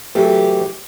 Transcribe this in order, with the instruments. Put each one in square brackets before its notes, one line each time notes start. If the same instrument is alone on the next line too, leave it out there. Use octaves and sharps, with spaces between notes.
[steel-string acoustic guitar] C#3 E3 G4 [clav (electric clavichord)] F#3 A3